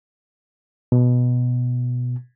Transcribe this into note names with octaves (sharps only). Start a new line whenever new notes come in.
B2